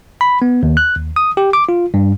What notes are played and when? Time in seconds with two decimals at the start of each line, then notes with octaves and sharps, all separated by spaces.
0.21 B5
0.42 B3
0.63 D#2
0.77 F#6
0.96 D#2
1.16 D#6
1.37 G4
1.53 D6
1.69 F4
1.94 G2